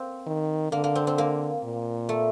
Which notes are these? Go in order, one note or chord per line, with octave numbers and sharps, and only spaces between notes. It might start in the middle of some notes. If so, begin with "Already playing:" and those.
Already playing: A#3 C4
D#3
D3 A#3
A#3
C4
C4
A#3
A#2
A3